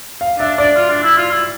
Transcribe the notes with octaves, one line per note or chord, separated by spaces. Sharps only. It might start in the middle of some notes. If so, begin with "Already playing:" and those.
F5
D4 E5
D4 D5
F4
D4
E4
F4
E4